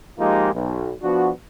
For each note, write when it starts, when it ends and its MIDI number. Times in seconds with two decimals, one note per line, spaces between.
0.19 0.51 53
0.19 0.51 56
0.19 0.51 58
0.19 0.51 63
0.19 0.51 65
0.19 0.51 67
0.53 0.92 35
1.02 1.29 53
1.02 1.29 59
1.02 1.29 62
1.02 1.29 66